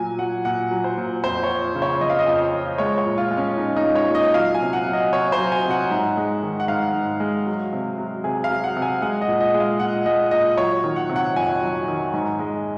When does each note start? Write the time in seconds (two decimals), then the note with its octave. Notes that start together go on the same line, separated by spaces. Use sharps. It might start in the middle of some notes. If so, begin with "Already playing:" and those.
Already playing: A#2 F#3 G#5
0.19 F#3 F#5
0.45 A#2 F#5
0.71 F#3
0.84 C5
0.98 A#2
1.24 F2 C5
1.43 C#5
1.50 F3
1.75 C#3
1.82 C#5
2.01 F2 D#5
2.10 F5
2.19 D#5
2.27 F2
2.53 F3
2.78 G#3 C#5
2.98 C#5
3.06 A#2
3.18 F4
3.31 G#3
3.37 C#4
3.57 A#2 D#4
3.76 D#4
3.83 G#3
3.95 C#5
4.09 A#2
4.15 D#5
4.34 F#3 F5
4.55 G#5
4.61 C3
4.73 F#5
4.87 F#3
4.93 D#5
5.13 C3 C#5
5.32 C5
5.38 F#3
5.52 G#5
5.65 C3
5.71 F#5
5.90 G#2
6.17 G#3
6.43 D#3
6.60 F#5
6.68 G#2 F5
6.94 G#2
7.20 G#3
7.46 F#3
7.73 C3
7.98 F#3
8.24 C3 G#4
8.44 F5
8.50 F#3
8.64 F#5
8.77 C3
8.82 G#5
9.02 G#3 F#5
9.22 D#5
9.28 A#2
9.40 D#5
9.54 G#3
9.60 F5
9.80 A#2 F#5
10.06 G#3 D#5
10.31 A#2 D#5
10.57 F#3 C#5
10.84 D#3
10.96 F#5
11.09 C3
11.16 F#5
11.36 F2 G#5
11.61 F#3
11.88 D#3
12.13 G#2
12.39 G#3